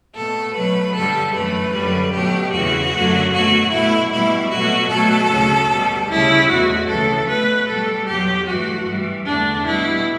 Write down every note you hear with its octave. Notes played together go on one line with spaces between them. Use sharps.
B2 A3 A4
B2 F#3 A3 B4
G2 D3 G3 A4
F#2 E3 A3 B4
F#2 D3 G3
B2 F#3 A3 G4
E2 C#3 E3 F#4
F#2 D3 F#3 A3
B2 F#3 A3 F#4
B2 A3 E4
B2 G3 E4
B2 F#3 A3 F#4
B2 F#3 A3 A4
D2 C#3 F#3
B2 G3
D2 C#3 G3 E4
E2 B2 A3 F#4
D2 C#3 E3 A4
B2 A3 B4
B2 G3 A4
E2 B2 F#3 G4
G2 E3 A3 F#4
G2 E3 G3
E2 D3 A3 D4
B2 G3 E4